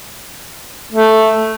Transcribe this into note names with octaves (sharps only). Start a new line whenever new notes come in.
A3